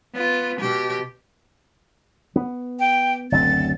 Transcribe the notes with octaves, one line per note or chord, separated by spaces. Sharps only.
B3 F4
B2 G4
B3
G5
F#1 D2 C4 A6